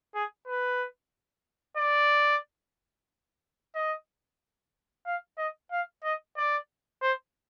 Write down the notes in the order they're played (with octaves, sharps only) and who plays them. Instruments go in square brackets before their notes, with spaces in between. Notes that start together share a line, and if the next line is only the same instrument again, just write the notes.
[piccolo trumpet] G#4
B4
D5
D#5
F5
D#5
F5
D#5
D5
C5